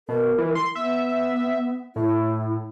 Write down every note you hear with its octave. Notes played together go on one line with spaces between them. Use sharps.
B2 A#4
E3
C6
B3 E5
A2 E4